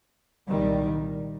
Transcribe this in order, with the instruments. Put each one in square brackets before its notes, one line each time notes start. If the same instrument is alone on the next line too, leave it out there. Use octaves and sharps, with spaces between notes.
[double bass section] C2 A#2 D#3 G3